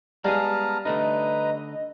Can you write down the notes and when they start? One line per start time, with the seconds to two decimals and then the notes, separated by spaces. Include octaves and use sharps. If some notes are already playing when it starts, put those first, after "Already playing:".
0.24 G3 G#3 B3 G#4 F5 A5 A#5 F6
0.85 D3 A3 D#4 B4 D#5 A#5